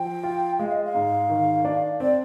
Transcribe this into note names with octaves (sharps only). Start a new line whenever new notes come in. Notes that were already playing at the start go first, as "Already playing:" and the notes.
Already playing: F3 G5
F4
G#3 F5
D#5
F5
G#2
D#3
D4
C4 D5